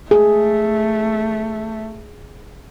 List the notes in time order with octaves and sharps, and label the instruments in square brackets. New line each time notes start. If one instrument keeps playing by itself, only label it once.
[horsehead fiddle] A3 [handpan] G#4